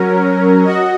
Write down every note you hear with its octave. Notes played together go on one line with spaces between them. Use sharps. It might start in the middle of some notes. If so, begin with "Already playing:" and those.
Already playing: F#3 C#4 A#4
F#4 D#5